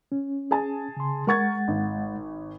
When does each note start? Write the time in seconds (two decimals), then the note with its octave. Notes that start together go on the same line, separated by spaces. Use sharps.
0.12 C#4
0.51 G#4 G#5 A5
0.97 C#3 C6
1.27 G#3 A#4 F#5 C#6 G#6 A6
1.68 G#1